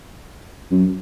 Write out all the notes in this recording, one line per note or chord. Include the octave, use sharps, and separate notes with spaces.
F#2